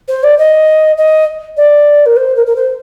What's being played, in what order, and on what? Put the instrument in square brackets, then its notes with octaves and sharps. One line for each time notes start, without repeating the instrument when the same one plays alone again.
[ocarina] C5
D5
D#5
D#5
D5
A#4
C5
A#4
A#4
C5